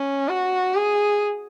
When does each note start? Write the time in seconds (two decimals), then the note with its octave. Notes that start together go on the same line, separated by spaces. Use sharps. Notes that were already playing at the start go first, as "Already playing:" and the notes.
Already playing: C#4
0.28 F#4
0.75 G#4